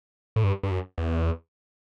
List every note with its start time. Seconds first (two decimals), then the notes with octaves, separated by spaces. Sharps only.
0.36 A2
0.44 G2
0.63 G2
0.71 F#2
0.98 E2